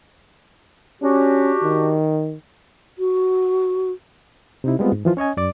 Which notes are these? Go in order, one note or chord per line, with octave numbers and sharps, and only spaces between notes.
C#4 D4 F#4 G4
D#3
F#4
C3 D#4 E4
G3 G#3 B3 C4 F4
G#2
E3 F3 F4
C#4 C#5 D#5 G#5
F#2 D5 D6